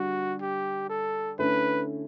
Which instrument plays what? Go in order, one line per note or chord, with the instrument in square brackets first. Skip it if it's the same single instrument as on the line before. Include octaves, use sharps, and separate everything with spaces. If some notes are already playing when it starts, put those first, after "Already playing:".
Already playing: [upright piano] D3 G3 D4 [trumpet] F#4
[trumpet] G4
A4
[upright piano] D3 A3 C#4 E4 [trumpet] B4